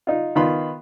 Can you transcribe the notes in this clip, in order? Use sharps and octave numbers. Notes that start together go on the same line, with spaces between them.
D#4 F4
D#3 B3 F4 B5 C6